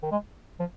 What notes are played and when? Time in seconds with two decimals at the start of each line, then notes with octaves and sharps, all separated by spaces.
0.02 D#3
0.11 G#3
0.59 F3